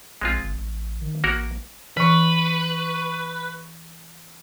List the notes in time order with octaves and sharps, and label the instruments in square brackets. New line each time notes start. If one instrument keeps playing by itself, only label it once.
[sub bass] A#1 [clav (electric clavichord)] G#3 C4 F4
[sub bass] G1
A1
D#3
[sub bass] A1 [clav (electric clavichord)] A#3 F#4 A#4
[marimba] E3 [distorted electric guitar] B4 [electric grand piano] C#6 B6